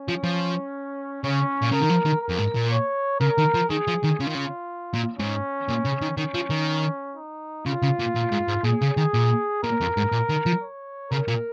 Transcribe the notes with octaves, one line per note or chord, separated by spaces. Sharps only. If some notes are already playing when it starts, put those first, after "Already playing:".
Already playing: C#4
F3
F3
C#3 C#4
A#2
C#3 A#4
D#3
F3
D#3
A#4
F2
G#2
A#2
C#5
C#3 A#4
D#3
F3
D#3 G#4
F3
D#3
C#3 F4
D#3
C#3
A#2
G#2 C#4
A#2
C#3
D#3
D#3 C#4
F3
D#3
D#4
C#3 F4
C#3
A#2
A#2
G#2
G#2
A#2 G#4
C#3
D#3
A#2
A#2 A#4
F2
G#2
A#2
D#3
F3
C#5
C#3 A#4
A#2